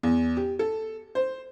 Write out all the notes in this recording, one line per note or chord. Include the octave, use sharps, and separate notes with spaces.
E2
G4
A4
C5